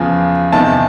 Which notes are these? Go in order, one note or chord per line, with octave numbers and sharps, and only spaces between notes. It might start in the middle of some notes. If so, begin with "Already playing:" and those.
Already playing: E2 C#3 F3
E2 C3 D#3 A5